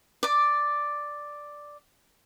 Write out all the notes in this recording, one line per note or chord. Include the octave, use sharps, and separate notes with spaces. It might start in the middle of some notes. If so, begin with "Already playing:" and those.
D5 D6